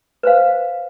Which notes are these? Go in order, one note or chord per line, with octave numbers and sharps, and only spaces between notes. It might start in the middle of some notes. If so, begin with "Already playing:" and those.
B4 C5 F5